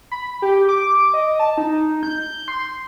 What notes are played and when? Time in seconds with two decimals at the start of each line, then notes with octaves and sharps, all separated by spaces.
0.12 B5
0.42 G4
0.69 D6
1.13 D#5
1.39 A5
1.58 D#4
2.03 G6
2.48 C6